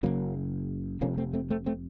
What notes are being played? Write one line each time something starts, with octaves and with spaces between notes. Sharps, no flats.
F#1 F#2 C#3 F#3 A#3
F1 F2 C3 A#3 C#4
A3 C4
A3 C4
A3 C4
A3 C4